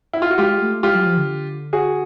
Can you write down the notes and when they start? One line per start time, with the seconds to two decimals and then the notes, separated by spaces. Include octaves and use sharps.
0.13 E4
0.22 F4
0.30 F#4
0.38 G#3 F4 G4
0.61 A3
0.83 G#3 F4 G4
0.94 F#3
1.06 F3
1.17 D3
1.73 F#4 G#4